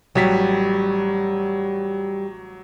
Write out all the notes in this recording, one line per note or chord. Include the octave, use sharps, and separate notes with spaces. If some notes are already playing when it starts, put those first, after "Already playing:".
A1 F#3 G3 B6